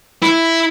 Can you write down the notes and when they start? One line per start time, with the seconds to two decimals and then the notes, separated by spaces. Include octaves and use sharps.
0.23 E4